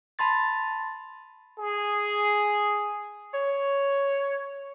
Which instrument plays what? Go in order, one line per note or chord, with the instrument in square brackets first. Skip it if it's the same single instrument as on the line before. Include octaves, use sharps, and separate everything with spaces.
[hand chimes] A5 B5 C6 A6
[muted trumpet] G#4
[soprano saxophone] C#5